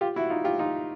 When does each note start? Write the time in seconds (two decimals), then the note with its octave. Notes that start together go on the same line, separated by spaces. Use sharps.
0.01 F4 G4
0.16 E4 F#4
0.30 D#4 F4
0.44 F4 G4
0.59 D#4 F4